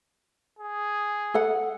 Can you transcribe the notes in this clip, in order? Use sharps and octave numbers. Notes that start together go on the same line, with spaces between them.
G#4
A4 F#5